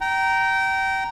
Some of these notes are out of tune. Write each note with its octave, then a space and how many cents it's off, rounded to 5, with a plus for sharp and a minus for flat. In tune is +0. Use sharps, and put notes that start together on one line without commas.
G5 -25 A#5 +0